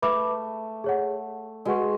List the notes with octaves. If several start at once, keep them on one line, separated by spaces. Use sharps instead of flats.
A3 B4 E5 B5 D6
G#4 C#5 F#5
G#3 F#4 B4 F#5 C#6